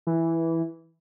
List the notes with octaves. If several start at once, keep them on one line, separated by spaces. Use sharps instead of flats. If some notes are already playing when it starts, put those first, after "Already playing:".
E3